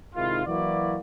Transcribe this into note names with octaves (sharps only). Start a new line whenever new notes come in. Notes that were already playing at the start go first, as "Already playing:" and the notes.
G#2 C3 D#3 E4 F4
E3 F#3 A#3 E4 F#4 D5